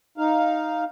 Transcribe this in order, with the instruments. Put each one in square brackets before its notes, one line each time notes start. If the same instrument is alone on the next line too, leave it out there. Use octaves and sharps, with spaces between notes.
[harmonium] D#4 F5